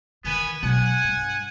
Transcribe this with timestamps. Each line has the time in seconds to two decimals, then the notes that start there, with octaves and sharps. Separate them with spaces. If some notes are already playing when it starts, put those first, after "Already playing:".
0.24 D#3 E3 B3 B4 G#5
0.63 B2 F#3 F#5 G#5
1.04 G2